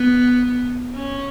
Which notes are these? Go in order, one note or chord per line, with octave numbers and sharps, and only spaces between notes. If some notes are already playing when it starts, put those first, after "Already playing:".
Already playing: B3
C#4